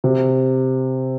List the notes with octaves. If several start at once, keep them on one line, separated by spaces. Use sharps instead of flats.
C3